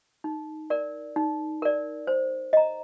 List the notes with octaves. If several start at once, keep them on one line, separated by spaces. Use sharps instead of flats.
D#4
A#4 D5
D#4
A#4 D5
C5
D#5 A#5